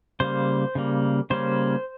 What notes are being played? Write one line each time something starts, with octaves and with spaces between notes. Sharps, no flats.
C#3 G3 A#3 C5
C#3 G3 A#3
C#3 G3 A#3 C#4 C5